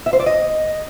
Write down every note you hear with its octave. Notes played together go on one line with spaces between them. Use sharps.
E5
C5
D5
D#5